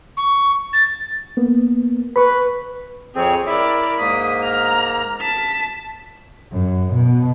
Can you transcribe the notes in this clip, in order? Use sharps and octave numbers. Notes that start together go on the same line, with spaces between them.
C#6
A6
A#3 B3
B4 B5 C#6
F2 C4 G#4 C#5
E4 A#4 D5 E5
G#2 A#3 D#6 B6
A#5 F6
A5 B6
F#2
B2